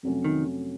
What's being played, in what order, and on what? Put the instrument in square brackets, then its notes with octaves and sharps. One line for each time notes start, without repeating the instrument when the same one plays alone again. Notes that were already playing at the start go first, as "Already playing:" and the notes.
[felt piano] F2 C3 F#3 A3 C#4
[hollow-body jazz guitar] D#3